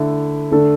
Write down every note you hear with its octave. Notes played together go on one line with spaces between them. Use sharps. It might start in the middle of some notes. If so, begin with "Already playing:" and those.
Already playing: D3 A3 E4
D3 A3 D4 A4